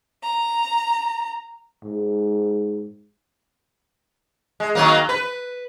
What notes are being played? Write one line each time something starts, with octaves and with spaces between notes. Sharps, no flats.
A#5
G#2
G#3
D#3 F#3 A#3
B4